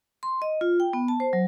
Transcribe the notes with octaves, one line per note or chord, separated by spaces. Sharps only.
C6
D#5
F4
G5
B3
A5
C5
F#3